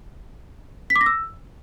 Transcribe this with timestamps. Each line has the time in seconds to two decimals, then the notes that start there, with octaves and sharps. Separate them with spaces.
0.90 B6
0.96 D6
1.01 A#6
1.06 E6